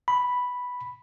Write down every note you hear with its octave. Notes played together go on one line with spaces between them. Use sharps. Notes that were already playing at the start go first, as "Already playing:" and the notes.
B5